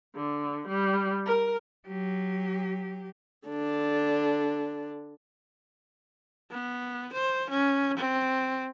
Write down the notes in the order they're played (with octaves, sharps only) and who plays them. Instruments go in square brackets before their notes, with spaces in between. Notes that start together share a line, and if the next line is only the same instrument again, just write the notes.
[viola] D3
G3
A#4
[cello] F#3 G4
[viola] D3 D4
[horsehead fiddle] B3
C5
C#4
C4